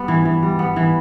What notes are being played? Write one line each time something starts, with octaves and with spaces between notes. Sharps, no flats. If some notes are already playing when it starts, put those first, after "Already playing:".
Already playing: G3 B3
E3
E3
G3
B3
E3